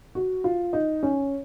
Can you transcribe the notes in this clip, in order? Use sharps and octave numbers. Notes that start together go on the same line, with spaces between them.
F#4
F4
D#4
C#4